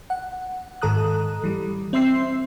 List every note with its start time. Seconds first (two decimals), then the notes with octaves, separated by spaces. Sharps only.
0.10 F#5
0.82 G#2 D#3 A4 A#5 D#6 F#6
1.44 E3 G3
1.93 C4 E5 C6 E6 C7